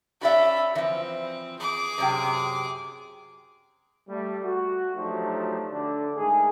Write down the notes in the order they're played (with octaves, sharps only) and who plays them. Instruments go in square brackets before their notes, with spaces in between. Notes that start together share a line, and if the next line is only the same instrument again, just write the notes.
[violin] C#4 B5 [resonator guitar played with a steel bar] F#4 D5 E5
[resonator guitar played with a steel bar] E3 F3 [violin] C4
[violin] G#4 D6
[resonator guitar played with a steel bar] F#2 C3 G5
[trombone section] G3 A3
F#4
F3 F#3 A3 D4 D#4 G4
D3 D4
G#2 D#3 A3 G#4